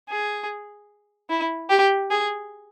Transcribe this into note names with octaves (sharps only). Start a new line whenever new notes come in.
G#4
E4
G4
G#4